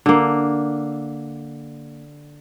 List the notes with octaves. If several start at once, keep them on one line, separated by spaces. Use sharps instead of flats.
D3 A#3